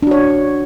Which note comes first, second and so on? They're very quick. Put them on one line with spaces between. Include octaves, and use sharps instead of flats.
D4 F#4 C#5